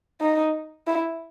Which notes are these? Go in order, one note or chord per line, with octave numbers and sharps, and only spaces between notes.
D#4
E4